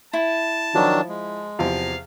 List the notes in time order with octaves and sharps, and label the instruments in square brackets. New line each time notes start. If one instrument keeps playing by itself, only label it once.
[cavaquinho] E4 [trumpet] A5
[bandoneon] D#3 F#3 D4 [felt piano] F3
[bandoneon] G#3
[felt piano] E2 C3 F3 [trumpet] F5